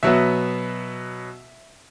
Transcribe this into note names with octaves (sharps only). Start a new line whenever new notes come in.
B2 F#3 B3 E5